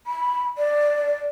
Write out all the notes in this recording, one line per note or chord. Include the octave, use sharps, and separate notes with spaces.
B5
D5